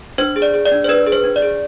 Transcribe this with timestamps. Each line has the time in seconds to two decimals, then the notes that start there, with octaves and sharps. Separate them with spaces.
0.18 D4 C5
0.36 G#4
0.42 D5
0.54 G#4
0.66 D5
0.72 D4
0.84 C5
0.88 D4 B4
1.06 G#4
1.12 C5
1.24 D4
1.36 D5
1.42 G#4